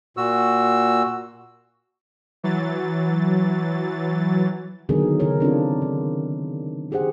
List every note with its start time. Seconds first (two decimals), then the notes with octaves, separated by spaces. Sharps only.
0.17 A#2 F#4 E6
2.44 E3 F#3 A6
4.89 D3 D#3 F#3 B3 G#4 A#4
5.20 C#3 F#3 E4 A#4 C#5
5.40 C4 D4 D#4 F4
5.82 D#3
6.91 D#3 G4 G#4 C5 F#5